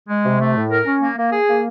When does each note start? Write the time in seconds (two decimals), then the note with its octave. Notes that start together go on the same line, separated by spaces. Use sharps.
0.09 G#3
0.25 C3
0.40 A3
0.56 A2
0.71 A#4
0.86 C#4
1.01 A#3
1.18 A#3
1.32 G#4
1.49 A#3